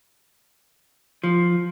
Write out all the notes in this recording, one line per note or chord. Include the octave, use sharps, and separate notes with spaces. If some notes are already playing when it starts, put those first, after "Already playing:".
F3